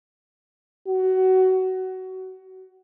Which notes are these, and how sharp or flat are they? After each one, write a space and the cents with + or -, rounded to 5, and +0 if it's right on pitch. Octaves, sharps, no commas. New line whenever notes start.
F#4 +20
F#4 +30